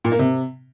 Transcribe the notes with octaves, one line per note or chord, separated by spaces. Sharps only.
A#2
A#3
C3